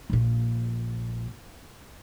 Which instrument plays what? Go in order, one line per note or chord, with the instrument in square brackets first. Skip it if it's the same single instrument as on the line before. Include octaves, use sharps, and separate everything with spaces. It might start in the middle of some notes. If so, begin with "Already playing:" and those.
[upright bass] A#1 A#2